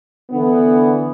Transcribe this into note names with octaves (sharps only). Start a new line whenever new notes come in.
D3 E3 B3